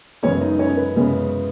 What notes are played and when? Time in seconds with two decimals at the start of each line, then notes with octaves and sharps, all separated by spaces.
0.23 F#2 C#3 G#3 B3 C#4 C#5
0.41 D#4 D#5
0.59 C#4 C#5
0.77 B4
0.96 F#2 C#3 G#3 B3